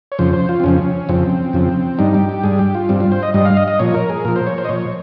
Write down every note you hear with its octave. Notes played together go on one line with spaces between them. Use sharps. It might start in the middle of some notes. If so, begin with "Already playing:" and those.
C#5
F2 C#3 F3 C5
C5
F4
C4
F2 C#3 F3 C#4
F2 C#3 F3 C4
F2 C#3 F3
G2 G3 D#4
G4
G4
G2 G3 G#4
G4
F4
G2 G3 C4
F4
C5
D#5
G2 G3 D#5
F5
D#5
D#5
A#2 F3 C#5
A#4
G#4
A#2 F3 A#4
C5
C#5
C5
D#5
A#2 F3 C#5